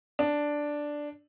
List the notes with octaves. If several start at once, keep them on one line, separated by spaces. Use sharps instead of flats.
D4